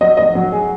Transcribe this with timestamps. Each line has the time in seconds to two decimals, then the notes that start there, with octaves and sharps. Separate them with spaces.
0.01 F#3 D#5
0.17 F1 D#5
0.35 F#3
0.52 G#4